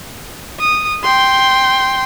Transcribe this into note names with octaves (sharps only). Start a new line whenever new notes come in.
D#6
G5 C6